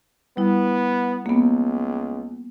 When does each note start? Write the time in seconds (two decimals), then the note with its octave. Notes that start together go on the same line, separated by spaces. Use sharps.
0.37 G3 B3 E4
1.26 C#2 A#3 B3